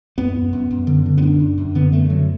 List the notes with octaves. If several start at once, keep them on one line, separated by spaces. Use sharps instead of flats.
F#2 B3
F#2
F#2
F#2
D3
D3
B3
F#2 D4
F#2
F#2
D3 B3
F#2 A3
D3 F#3